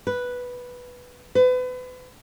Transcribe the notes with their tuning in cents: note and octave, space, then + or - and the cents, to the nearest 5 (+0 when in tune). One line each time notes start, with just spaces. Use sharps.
B4 -5
B4 +35